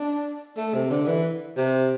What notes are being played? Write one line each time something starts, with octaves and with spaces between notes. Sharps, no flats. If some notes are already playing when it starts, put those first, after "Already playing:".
Already playing: D4
A3
C3
D3
E3
C3